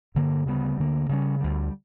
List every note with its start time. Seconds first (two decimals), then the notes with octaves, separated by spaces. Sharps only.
0.15 G2 D3 A#3
0.46 D2 C#3 G3 B3
0.77 D2 D3 A#3
1.09 C#3 G3 A#3 C#4
1.40 D2 D3 G3